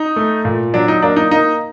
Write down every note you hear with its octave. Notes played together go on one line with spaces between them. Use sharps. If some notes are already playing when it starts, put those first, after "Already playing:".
Already playing: D#4
A3
A#2
F#3 D4
D#4
A#3 D4
D#4
A#3 D#4